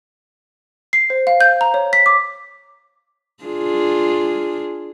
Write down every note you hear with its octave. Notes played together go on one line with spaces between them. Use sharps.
C7
C5
F5
G6
A#5
C#5
B6
D6
D4 F4 G#4